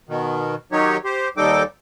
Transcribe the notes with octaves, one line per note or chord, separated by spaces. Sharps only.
B2 D#3
D#3 F#3 D#4 G4 C#5
G4 C5
D#2 G3 D#4 A4 G5 D6